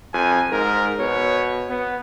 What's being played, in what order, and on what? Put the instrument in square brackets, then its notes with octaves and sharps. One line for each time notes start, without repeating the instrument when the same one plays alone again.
[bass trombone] F2 [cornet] G#5
[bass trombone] G#2 [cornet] A#4
[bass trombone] B2 [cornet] C#5
[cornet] B3